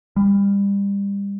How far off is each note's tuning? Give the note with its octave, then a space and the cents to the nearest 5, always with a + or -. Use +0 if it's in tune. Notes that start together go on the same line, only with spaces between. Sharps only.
G3 +30